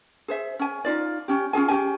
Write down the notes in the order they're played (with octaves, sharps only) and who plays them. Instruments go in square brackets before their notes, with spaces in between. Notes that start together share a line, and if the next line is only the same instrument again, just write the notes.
[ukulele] G#4 C5 E5
C#4 G#5
D#4 F4 D5
C#4 G4
C#4 F4 G#4 G#5
C#4 D#4 G4 G#5